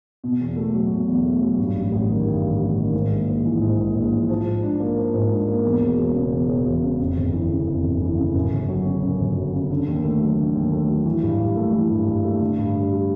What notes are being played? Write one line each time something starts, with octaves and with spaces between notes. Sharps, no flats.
B2
E2
A3
F#3
B2
E2
A3
F#3
G2
A1
A1
D#3
G2
A1
A1
D#3
G#2
A#1
A#1
E3
G#2
A#1
A#1
E3
F3
G#2
D4
A#3
F3
G#2
D4
A#3
E2
E1
E1
C#3
E2
E1
E1
C#3
F2
G1
E3
C#3
F2
G1
E3
C#3
F#2
G1
F#3
C#3
F#2
G1
F#3
C#3
D3
D#2
A3
F#3
D3
D#2
A3
F#3
E3
G2
G2
A3
E3
G2
G2
A3
D3
G2
G2
G3